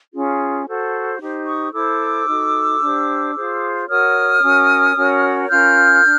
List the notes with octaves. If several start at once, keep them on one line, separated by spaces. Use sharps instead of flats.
C#4 F4 G#4
F#4 A4 C5
D#4 G4 C5
C#6 D#6
E4 A4 C5 D6 E6
D#4 F#4 A4
D4 G4 C5
F4 G#4 C5
F#4 A#4 C#5 D#6 F6
C#4 F#4 A#4 C#5
C#4 F#4 A#4 C#5
C#4 F4 A#4 F6 G6
D4